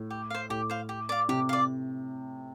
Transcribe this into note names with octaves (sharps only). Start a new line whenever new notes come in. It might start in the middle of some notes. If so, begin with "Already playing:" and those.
Already playing: A2
G4
C5 F5
A2 G4
C5 F5
G4
D5 F5
C3 G4
D5 F5